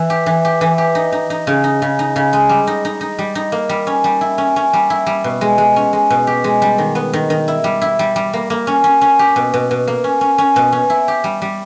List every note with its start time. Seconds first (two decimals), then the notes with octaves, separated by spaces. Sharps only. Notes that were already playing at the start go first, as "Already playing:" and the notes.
Already playing: E3
0.10 G4
0.26 E3
0.45 G4
0.61 E3
0.78 G4
0.95 D#4
1.12 D#4
1.30 D#4
1.47 C#3
1.64 D#4
1.82 C#3
1.99 D#4
2.16 C#3
2.33 G#3
2.49 G3
2.67 D#4
2.85 D#4
3.01 D#4
3.19 G3
3.35 D#4
3.52 A#3
3.69 G3
3.87 C#4
4.04 G3
4.21 E4
4.38 C#4
4.56 C#4
4.73 G3
4.90 E4
5.07 G3
5.24 B2
5.41 G#3
5.58 G#3
5.76 C#4
5.93 G#3
6.10 B2
6.27 G4
6.44 G#3
6.62 G3
6.78 D#3
6.95 B3
7.13 D#3
7.30 D#3
7.48 E4
7.64 G3
7.81 E4
7.99 G3
8.16 G3
8.33 A#3
8.50 A#3
8.67 C#4
8.84 C#4
9.01 C#4
9.19 G4
9.36 B2
9.54 B2
9.71 B2
9.87 A#3
10.04 C#4
10.21 C#4
10.38 C#4
10.56 B2
10.72 C#4
10.90 E4
11.08 G4
11.24 G3
11.42 G3